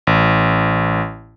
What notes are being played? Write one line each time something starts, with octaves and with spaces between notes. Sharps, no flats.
A1